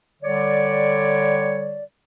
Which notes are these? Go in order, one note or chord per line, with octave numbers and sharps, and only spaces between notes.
D3 G3 C#5 D5